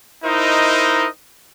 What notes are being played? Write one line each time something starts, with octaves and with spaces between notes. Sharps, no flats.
D#4 E4 A#4 C5 D#5